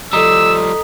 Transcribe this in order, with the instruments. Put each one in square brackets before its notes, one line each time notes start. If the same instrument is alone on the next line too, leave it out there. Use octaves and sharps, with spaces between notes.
[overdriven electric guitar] F3 G3 [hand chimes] A4 D#5 B6 [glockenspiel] A#5 D#6 [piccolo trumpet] E6